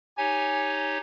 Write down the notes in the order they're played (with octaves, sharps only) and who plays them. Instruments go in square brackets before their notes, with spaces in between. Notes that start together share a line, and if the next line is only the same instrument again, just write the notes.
[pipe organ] D#4 G4 C#5 [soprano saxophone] G#5